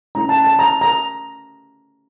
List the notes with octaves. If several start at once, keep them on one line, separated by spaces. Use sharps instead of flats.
A3 C#4 E4 A#5
A5
A5
A#5
A#5